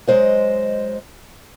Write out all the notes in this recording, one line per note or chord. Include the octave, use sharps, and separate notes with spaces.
F#3 G#3 C5 D#5